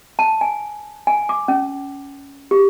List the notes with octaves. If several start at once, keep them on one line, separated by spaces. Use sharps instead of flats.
A5
G#5
G#5
D6
C#4
G4